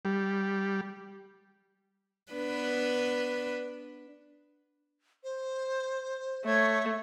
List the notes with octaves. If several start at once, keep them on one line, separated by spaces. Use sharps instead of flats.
G3
B3 D4 B4
C5
A3 C#5